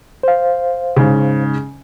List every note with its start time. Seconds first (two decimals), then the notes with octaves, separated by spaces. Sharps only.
0.23 C5 F5
0.97 G#2 C#3